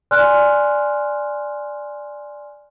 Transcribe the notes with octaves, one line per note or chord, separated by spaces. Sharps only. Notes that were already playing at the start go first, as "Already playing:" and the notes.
D5 G#5 C6 F6 F#6